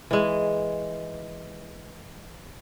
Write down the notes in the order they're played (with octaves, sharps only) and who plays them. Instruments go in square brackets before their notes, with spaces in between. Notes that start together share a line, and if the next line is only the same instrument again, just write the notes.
[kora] E3 G#3